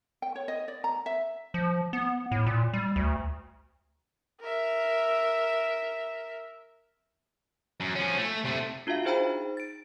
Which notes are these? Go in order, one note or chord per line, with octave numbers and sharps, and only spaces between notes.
G5
C#5
D#5
D5
A#5
E5
F3
B3
A2
A#2
G3
D2
A#4 E5
F#2
F3 C#4
A3
C3 A3
D4 F4 F#4 E5 F5
D#4 G#4 C5 G5 A#5 B5
A6 D7